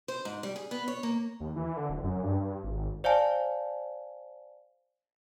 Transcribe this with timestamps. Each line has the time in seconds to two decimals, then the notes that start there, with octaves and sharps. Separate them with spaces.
0.08 C5
0.25 G#2
0.43 G3
0.56 G#4
0.71 B3
0.88 C#5
1.03 A#3
1.40 D#2
1.56 E3
1.77 D3
1.90 D1
2.04 F#2
2.23 G2
2.40 G2
2.63 G#1
3.04 C5 D5 F5 G#5 A5